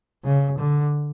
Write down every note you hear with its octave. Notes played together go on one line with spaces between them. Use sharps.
C#3
D3